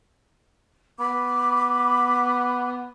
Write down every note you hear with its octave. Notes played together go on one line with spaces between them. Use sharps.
B3 B5 D6